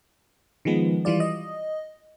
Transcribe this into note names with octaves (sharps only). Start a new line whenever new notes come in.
D#3 F3 G#3 B3
E3 G3 F4 D5
D#5